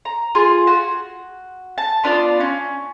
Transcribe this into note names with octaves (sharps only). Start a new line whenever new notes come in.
A#5
F4 G#4
F#4
A5
B3 D4 F4 D5
C#4